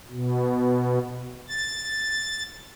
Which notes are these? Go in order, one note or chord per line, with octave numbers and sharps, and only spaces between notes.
B2
A6